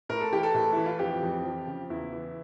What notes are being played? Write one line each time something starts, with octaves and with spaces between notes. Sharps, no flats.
A2 A#4
A4
E3 G4
A4
A2
E3 E4
F4
F2 G4
F2
F3
C#3
E2 E4
E3